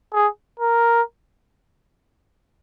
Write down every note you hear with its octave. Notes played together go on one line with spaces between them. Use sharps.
G#4
A#4